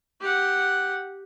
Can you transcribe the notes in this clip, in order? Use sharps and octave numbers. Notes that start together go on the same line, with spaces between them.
G4 F#5